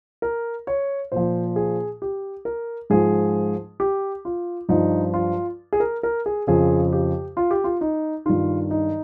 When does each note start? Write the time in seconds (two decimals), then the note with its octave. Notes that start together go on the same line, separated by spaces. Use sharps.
0.22 A#4
0.67 C#5
1.12 A#2 F3 C5
1.56 G#4
2.02 G4
2.45 A#4
2.90 G#2 F3 G#4
3.80 G4
4.25 F4
4.69 G2 F3 D#4
5.14 F4
5.73 G#4
5.80 A#4
6.03 A#4
6.26 G#4
6.47 F2 C#3 F3 G#4
6.93 G4
7.37 F4
7.51 G4
7.64 F4
7.81 D#4
8.26 G2 D#3 F4
8.71 D#4